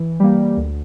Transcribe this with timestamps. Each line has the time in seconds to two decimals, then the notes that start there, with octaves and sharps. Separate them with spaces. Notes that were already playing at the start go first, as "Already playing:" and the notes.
Already playing: E3
0.20 G3 A#3
0.57 D2